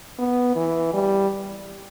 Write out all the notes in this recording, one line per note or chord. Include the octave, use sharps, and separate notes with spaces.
B3
E3
G3